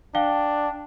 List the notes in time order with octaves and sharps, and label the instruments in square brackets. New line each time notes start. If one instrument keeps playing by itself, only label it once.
[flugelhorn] D4 [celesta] F5 G5 G7